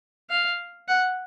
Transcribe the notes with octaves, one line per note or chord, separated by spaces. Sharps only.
F5
F#5